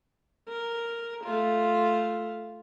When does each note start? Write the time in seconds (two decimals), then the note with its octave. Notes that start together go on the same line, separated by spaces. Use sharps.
0.49 A#4
1.24 A3 F4